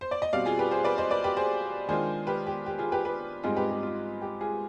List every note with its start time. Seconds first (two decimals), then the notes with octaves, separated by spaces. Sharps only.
0.01 C5
0.11 D5
0.22 D#5
0.33 B2 G3 C4 D5 F5
0.46 F4 G#4
0.59 G4 B4
0.71 G#4 C5
0.84 B4 D5
0.98 C5 D#5
1.10 B4 D5
1.24 G4 B4
1.37 G#4 C5
1.88 D#3 G#3 D4 F4 G#4 C5
2.27 G4 B4
2.47 G4
2.66 G4
2.79 F4 G#4
2.92 G4 B4
3.05 G4 B4
3.43 G#2 G3 C4 D#4 F4 G#4
3.56 G4 B4
3.70 G4
3.83 F4
4.22 G4
4.41 F4 G#4